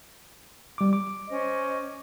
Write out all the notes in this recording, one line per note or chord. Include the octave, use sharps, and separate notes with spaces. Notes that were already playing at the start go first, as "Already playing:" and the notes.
G3 D6
D6
C#4 C5 D#5